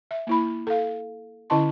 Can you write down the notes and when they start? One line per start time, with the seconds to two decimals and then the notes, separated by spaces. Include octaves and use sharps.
0.11 E5
0.27 A#3 E4 B5
0.67 A4 F5
1.50 D3 C#4 E4 D#5 A5 C6